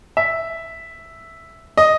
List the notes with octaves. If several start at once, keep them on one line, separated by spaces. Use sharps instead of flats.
E5
D#5